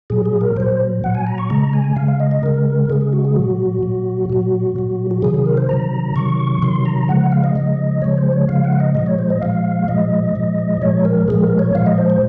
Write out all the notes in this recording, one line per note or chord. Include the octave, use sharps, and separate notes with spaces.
A#2 F#3 G#4
G#4
A#4
A#2 F#3 C5
A#2 F#3 F#5
G#5
A#5
C#6
C#3 G#3 A#5
G#5
C#3 G#3 F5
F5
D#5
D#5
C#3 G#3 A#4
C#3 G#3 G#4
G#4
F#4
G#4
A#2 F#3 F#4
A#2 F#3
A#2 F#3 F#4
A#2 F#3
F#4
C3 D#3 F#3 G#4
G#4
A#4
C5
C3 D#3 F#3 A#5
C3 D#3 F#3 C#6
C3 D#3 F#3 C6
A#5
C#3 F3 G#3 F#5
F#5
F5
D#5
C#3 F3 G#3 D#5
C#3 F3 G#3 C#5
C5
C#5
C#3 F3 G#3 F5
F#5
F5
D#5
A#2 F3 G#3 D#5
C#5
C5
D#5
A#2 F3 G#3 F5
A#2 F3 G#3 D#5
A#2 F3 G#3
A#2 F3 G#3 C#5
A#4
A#2 F3 G#3 G#4
A#4
C#5
A#2 F3 G#3 F5
D#5
C5
C5